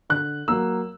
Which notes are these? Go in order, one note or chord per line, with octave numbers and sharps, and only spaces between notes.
D3 F#6
F#3 A#3 E6